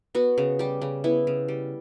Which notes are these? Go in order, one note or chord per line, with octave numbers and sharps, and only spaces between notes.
B3 F#4
C#3
G3 G4
C#3
B3 E4
C#3
G3